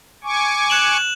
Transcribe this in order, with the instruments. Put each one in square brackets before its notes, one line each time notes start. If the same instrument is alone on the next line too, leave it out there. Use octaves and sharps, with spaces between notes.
[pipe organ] G#5 C#6 D6
[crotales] F#6 E7 F#7